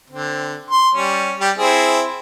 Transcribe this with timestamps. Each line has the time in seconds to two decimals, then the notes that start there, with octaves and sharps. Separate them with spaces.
0.10 D3 C4
0.71 C6
0.95 G3 C#4
1.40 G3 G4
1.58 C4 E4 G#4